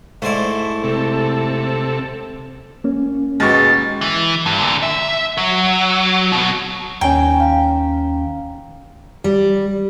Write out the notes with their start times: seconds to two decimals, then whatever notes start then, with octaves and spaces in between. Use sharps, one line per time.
0.22 G#2 A3 E4 C5 D5
0.83 C3 A4
2.84 A#3 C#4
3.40 D#2 B2 G#3 C#6 A6
4.01 E3
4.46 G2
4.59 A#2 D3
4.82 E5
5.38 F#3
6.32 B2 F#3
7.01 D#2 D#3 C#4 C#5 G5 G#5 A#5
7.40 F5 A#5
9.24 G3